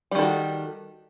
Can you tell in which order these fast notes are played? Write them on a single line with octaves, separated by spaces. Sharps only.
G3 D#3 A4 F#4